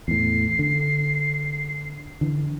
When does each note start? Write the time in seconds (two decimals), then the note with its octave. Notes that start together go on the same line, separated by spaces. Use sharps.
0.08 E2 A2 C7
0.59 D3
2.21 D3 E3